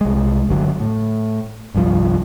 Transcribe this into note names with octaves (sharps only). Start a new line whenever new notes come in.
C2 G#3
G1 D3 F#3
A2
G1 C2 G2 F3